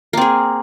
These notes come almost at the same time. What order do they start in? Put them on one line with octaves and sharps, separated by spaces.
A#3 C4 G#4